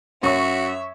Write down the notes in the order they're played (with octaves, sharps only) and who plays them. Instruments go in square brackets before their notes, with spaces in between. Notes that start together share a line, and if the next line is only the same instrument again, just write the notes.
[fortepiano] F#2 [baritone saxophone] F#4 [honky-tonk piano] C#5 C#6 [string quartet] E5